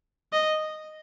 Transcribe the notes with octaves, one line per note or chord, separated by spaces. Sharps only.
D#5